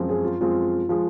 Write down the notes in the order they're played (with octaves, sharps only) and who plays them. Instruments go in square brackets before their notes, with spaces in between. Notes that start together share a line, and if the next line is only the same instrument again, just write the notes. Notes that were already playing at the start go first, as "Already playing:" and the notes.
Already playing: [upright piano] F#2 F3 G#3 C4
[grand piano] G#4
F4
[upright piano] F#2 F3 G#3 C4 [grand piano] F4
[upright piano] F3 G#3 [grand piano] F4